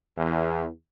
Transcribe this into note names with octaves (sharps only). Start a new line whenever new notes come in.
E2